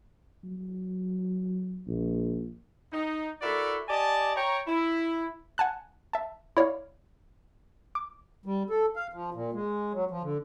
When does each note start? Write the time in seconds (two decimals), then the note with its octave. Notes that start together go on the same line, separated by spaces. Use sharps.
0.44 F#3
1.87 A#1
2.92 D#4
3.42 E4 F#4 A4 A#4 D5 E5
3.89 G4 D5 D#5 G#5 A5
4.36 C#5 G5 A#5
4.66 E4
5.58 F#5 G#5 A5 F#6
6.13 E5 A5
6.57 E4 C#5 D5 F5
7.95 D6
8.46 G3
8.70 A4
8.96 F5
9.13 F3
9.34 A#2
9.54 G#3
9.94 F#3
10.11 F3
10.23 D3